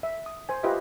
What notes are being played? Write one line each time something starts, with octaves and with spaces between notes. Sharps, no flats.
E5
D#6
C5 G#5
F4 G4 B4 C5 D#5 E5